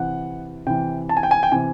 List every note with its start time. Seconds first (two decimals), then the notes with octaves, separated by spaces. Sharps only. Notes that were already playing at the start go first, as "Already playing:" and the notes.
Already playing: C3 E3 F#5
0.66 C3 E3 G5
1.09 A5
1.17 G#5
1.23 G5
1.31 G#5
1.43 G5
1.52 C3 E3 G#5